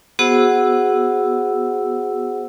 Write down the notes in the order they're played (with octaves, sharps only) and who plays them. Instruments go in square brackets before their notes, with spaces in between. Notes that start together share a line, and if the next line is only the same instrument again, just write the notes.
[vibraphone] B3 F#4 G#4 C5 F#5 E6